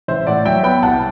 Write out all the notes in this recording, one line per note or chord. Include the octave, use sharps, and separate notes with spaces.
A1 C5 E5
A2 D5 F#5
F#3 E5 G5
B3 G5 B5
C2 F#5 A5